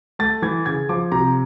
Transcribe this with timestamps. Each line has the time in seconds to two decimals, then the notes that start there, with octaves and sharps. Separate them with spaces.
0.19 A3 A6
0.42 E3 G#6
0.66 C#3 G#6
0.89 F3 D6
1.12 C3 A#5